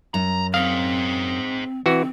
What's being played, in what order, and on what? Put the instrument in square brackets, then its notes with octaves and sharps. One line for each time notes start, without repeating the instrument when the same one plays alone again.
[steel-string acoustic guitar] F#2 [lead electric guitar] A#5
[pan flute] C4 [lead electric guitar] G#4 C5 [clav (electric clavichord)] F5
[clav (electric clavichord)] E3 F#4 [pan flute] C4